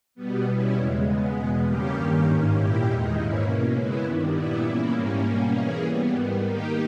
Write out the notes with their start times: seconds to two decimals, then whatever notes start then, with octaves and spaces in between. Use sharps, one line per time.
0.15 B2 G3 B3
0.45 B2 G3 C#4 E4
0.75 E2 C#3 G#3
1.05 C#3 G#3 B3
1.34 E2 B2 G#3 B3
1.65 C#3 G3 A#3 C#4 G4
1.94 G2 D#3 A#3 C#4 G4
2.24 G#2 D#3 A#3 C#4
2.53 A#2 A#3 E4 G4
2.83 E2 D#3 G#3 D#4
3.13 G#2 E3 A#3 C#4 E4
3.42 B2 A#3 C#4
3.72 C#3 G#3 B3 E4
4.02 G2 D#3 G3
4.32 A#2 G3 B3 E4
4.61 C#3 E3 A#3 E4
4.92 G#2 G3 A#3 C#4
5.22 B2 G3 A#3 C#4
5.51 E3 A#3 C#4 G#4
5.81 E3 G3 B3
6.11 G#2 D#3 G3 B3
6.40 D#3 A#3 D#4 G4